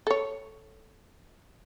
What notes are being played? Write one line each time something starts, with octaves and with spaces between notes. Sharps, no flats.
A4 C#5